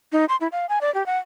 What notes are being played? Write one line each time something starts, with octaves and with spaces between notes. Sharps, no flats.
D#4
C6
E4
F5
G#5
D5
G4
F#5